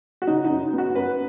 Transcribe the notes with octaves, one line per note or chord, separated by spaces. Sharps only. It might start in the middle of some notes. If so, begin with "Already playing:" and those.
F#4
C#3 D#4
D#4
F#2
B3
F#4
F#2 B4